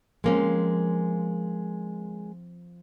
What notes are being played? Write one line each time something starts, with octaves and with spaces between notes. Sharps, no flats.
F3 G#3 A#3 C4 C#4